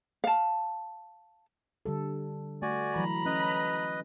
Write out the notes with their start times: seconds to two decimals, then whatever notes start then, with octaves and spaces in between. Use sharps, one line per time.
0.24 F5 A5
1.86 D3 G3 A4
2.62 A3 F#4 D5 G#5
2.96 E3 F#3 A#5 B5
3.26 C#4 B4 D#5